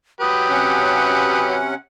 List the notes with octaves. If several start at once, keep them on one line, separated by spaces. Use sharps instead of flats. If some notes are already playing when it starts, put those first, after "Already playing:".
F#3 G4 B4 D#6
C3 C#4 F#5